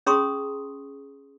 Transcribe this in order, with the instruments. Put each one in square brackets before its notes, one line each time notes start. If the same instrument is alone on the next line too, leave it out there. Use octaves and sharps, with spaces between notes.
[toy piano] C#4 G#4 A#5 C6 C#6 D#6